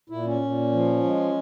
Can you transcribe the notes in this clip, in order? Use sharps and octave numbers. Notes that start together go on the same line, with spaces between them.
A#2 E4
C#4
A#2
F3
G#3